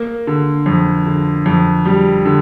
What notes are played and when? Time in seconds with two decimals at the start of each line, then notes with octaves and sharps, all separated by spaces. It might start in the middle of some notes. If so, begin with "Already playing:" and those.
Already playing: A#3
0.27 D3
0.66 F2
1.06 D3
1.46 F2
1.85 G3
2.25 D3